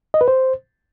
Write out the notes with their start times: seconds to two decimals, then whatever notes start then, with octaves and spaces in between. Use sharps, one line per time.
0.14 D#5
0.21 B4
0.28 C5